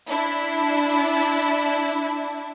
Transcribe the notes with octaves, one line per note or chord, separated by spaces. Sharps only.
D4 E4